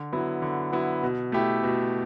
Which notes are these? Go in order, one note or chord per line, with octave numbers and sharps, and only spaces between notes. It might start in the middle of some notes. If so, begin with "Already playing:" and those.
Already playing: D3
F#3 B3 E4
D3
F#3 B3 E4
B2
A3 E4 G4
B2